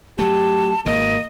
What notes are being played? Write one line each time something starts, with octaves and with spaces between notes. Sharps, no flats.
F#3 A3 G4 A5
G#1 B2 A#3 D#5